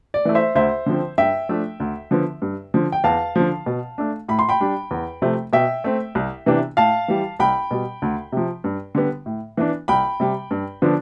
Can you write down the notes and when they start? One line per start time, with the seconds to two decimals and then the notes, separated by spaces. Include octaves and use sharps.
0.14 D5
0.25 E3 A3
0.35 C5 E5
0.55 D2 C5 E5
0.86 D3 F3 C4
1.18 G2 E5 G5
1.49 F3 A3 D4
1.80 D2
2.11 D3 F3 B3
2.42 G2
2.74 D3 F3
2.92 G5
3.04 E2 F5 A5
3.36 D3 F3
3.66 B2
3.98 A3 D4
4.28 A2 B5
4.39 C6
4.49 G5 B5
4.60 G3 D4
4.91 E2
5.22 C3 F3 A3 C4
5.53 B2 E5 G5
5.84 A3 C4
6.15 C2
6.46 C3 E3 B3 D4
6.77 A2 F5 A5
7.08 E3 G3
7.40 C2 G5 B5
7.71 B2 G3
8.02 D2
8.32 C3 F3
8.64 G2
8.95 D3 G3 B3
9.26 A2
9.57 E3 B3 D4
9.88 C2 G5 B5
10.20 C3 G3
10.51 G2
10.82 D3 F3 B3 D4